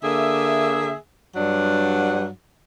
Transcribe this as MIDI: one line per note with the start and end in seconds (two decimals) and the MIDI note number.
0.02 0.93 50
0.02 0.93 58
0.02 0.93 68
0.02 0.93 76
1.35 2.27 43
1.35 2.27 54
1.35 2.27 55
1.35 2.27 62
1.35 2.27 78